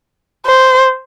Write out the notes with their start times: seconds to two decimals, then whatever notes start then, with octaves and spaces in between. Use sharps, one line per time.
0.46 C5